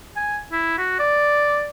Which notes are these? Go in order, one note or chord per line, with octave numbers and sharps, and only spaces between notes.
G#5
E4
F#4
D5